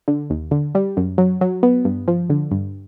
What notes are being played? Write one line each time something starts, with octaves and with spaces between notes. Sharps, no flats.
D3
D#2
D3
G3
F#2
F#3
F#3
B3
G2
F3
D3
G2